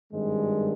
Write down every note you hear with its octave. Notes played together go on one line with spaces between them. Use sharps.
G#1 G2 D#3 G3 G#3